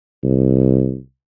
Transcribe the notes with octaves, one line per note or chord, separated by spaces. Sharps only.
C2